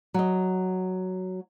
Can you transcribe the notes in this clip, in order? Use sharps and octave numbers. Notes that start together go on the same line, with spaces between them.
F#3 D#5